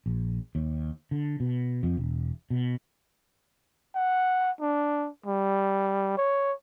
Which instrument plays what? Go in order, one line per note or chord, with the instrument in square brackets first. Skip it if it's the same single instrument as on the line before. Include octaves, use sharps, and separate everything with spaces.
[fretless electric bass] A#1
D#2
D3
B2
F2
E1
B2
[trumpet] F#5
D4
G3
C#5